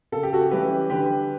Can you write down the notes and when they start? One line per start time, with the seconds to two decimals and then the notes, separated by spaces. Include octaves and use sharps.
0.12 C#3 A4
0.23 G4
0.33 F#4 A4
0.51 E3 G3 C#4 E4 G4 B4
0.90 D3 G4 B4